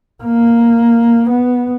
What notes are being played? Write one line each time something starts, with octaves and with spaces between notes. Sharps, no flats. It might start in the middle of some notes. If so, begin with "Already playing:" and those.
A#3
B3